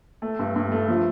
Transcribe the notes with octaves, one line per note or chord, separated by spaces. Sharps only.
A3
G2
G2
A3
F3